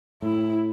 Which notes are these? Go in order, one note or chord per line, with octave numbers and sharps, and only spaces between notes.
A2 E4